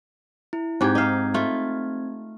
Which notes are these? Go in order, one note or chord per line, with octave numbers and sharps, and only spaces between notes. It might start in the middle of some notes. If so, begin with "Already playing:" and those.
E4
G#2 C4 G4 G#6
D#4 F5
A3 F4